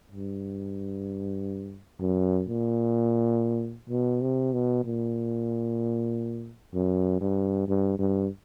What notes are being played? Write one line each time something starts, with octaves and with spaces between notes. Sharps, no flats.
G2
F#2
A#2
B2
C3
B2
A#2
F#2
G2
G2
G2